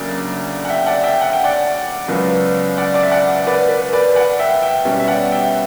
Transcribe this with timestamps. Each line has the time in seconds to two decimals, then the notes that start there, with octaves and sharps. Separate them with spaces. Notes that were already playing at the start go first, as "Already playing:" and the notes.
Already playing: D2 C#3 F#3 A#3 D5
0.65 F#5
0.69 E5 G5
0.86 D5 F#5
1.03 E5 G5
1.21 F#5
1.33 G5
1.44 D5 F#5
2.08 C#2 C#3 F#3 B3
2.77 D5 F#5
2.94 D5
3.03 E5
3.11 D5 F#5
3.47 B4 D5
3.69 B4
3.93 B4 D5
4.15 D5 F#5
4.39 E5 G5
4.62 E5 G5
4.85 B2 G3 C#4
5.00 E5
5.08 D5 F#5
5.32 E5 G5